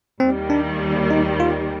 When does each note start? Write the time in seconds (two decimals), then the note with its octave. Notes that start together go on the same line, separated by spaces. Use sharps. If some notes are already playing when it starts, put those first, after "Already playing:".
0.20 D#2 D#3 G3 C4
0.50 D4
1.11 D#4
1.40 F4